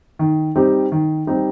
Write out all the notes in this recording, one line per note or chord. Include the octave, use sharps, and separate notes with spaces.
D#3
G3 C4 D#4 G4
D#3
G3 C4 D#4 G4